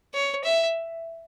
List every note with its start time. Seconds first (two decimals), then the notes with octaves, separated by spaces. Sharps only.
0.14 C#5
0.44 E5